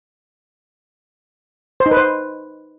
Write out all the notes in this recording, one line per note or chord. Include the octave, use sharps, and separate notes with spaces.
C5
D#4
B4
C5